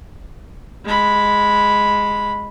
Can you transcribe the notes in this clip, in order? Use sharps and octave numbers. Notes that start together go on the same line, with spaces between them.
G#3 B5